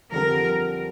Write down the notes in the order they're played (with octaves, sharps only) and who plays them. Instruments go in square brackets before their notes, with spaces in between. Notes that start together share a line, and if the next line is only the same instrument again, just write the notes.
[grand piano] F2 D3 G3 [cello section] A#4